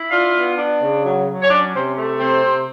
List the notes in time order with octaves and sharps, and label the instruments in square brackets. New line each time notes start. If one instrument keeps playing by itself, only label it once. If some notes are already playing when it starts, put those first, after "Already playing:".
Already playing: [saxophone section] E4
D4 F4 F5
B3
D4
C#3
F#3
F#3
C#5
C#4 D4 D5
C3 C4 C5
A3
C3 C4 C5
C3